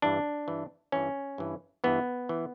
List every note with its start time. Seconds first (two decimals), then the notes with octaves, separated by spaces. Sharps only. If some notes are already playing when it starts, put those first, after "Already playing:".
0.02 G2 E3 D4
0.48 G2 E3
0.92 G2 E3 C#4
1.38 G2 E3
1.84 G2 E3 B3
2.29 E3